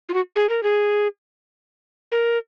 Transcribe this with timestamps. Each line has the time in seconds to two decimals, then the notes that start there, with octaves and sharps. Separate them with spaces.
0.09 F4
0.14 F#4
0.36 G#4
0.49 A#4
0.63 G#4
2.12 A#4